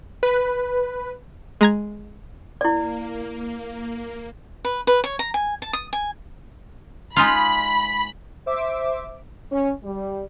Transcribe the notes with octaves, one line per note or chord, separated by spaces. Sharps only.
B4
G#3 A#5 G#6
A#3 E4 D5
B4
B4
C#5
A#5
G#5
A5
D#6
G#5
G#3 D#4 F4 B5
C5 E5 D6
C#4
G3